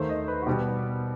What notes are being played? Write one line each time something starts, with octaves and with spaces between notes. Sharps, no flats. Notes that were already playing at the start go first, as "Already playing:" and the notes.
Already playing: D#2 D#3 A3 C5
D#5
B4
F#4
B2 G3 B3 G4